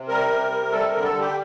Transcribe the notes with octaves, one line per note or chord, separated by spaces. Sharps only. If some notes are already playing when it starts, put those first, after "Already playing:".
Already playing: C3
G3 A#4
C3
C3
G3 A4
A#4
D3
A4
G3
G4